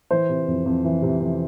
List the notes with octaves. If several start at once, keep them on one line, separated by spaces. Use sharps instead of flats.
E3 C5
C3
F2
F2
E3
C3
F2